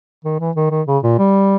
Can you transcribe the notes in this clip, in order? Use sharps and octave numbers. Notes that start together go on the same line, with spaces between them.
D#3
E3
D#3
D#3
C#3
A#2
G3